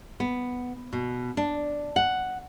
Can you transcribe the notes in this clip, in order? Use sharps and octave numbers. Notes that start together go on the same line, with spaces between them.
B3
B2
D4
F#5